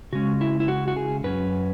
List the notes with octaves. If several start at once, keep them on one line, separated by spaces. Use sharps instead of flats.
C#3 G#3 C#4 F#4
E4
E4
F#4
F#4
G#4
F#2 F#3 C#4 B4